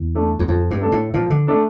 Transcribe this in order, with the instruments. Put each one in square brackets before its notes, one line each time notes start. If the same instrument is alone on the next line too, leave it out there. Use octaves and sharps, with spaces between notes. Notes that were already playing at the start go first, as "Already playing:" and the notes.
Already playing: [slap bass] E2
[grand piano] A3 D4 A4
[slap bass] E2
[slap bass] F2 [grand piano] F3
[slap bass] G2
[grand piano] A3 D4 A4
[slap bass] A2
[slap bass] A#2 [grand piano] F3
[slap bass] D3
[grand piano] A3 D4 A4